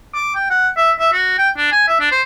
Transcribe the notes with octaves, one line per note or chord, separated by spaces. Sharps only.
D6
G5
F#5
E5
E5
F#4
G5
D4
G#5
E5
D4
C5